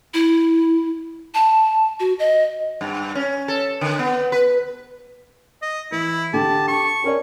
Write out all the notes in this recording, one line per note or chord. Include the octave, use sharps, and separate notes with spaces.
E4
A5
F#4
D#5
G2
C#4
A4
D3
B3
B4
D#5
E3 E4
D3 G4 A5
A5 C#6 D6
C#4 A#4 D5